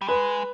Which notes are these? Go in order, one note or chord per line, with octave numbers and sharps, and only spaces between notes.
G3
G#3 B4